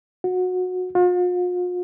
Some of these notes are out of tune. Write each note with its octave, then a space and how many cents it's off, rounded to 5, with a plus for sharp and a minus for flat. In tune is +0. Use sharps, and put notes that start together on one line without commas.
F#4 -20
F4 +45